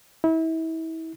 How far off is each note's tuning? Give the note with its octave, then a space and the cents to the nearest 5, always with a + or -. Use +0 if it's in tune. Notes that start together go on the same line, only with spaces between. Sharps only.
E4 -35